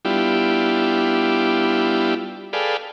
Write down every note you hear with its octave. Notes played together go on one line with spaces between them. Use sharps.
G3 B3 D4 E4 F4 G4
G#4 A4 B4 D5 F5 G5